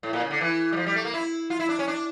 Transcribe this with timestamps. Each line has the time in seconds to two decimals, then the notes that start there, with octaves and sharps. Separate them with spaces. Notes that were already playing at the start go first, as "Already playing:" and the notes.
0.03 A2
0.13 A#2
0.21 C#3
0.30 D3
0.41 E3
0.72 G3
0.76 F3
0.86 G3
0.96 A3
1.05 A#3
1.14 E4
1.50 F4
1.60 E4
1.69 D4
1.79 C#4
1.88 D4